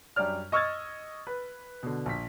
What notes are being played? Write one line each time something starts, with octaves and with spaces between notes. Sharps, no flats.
F#2 G3 D4 D5 F6
D#5 C#6 E6 F6 G#6 A6
B4
B2 D3
A#1 B6